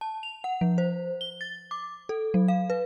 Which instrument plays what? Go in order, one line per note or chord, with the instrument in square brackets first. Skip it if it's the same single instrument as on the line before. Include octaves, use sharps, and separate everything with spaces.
[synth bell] A5
F7
F#5
F3
C5
G7
A6
D6
A4
F#3
F5
B4